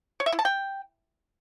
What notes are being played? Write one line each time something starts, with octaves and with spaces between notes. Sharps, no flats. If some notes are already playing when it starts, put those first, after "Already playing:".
C#5
E5
E4
A5
G5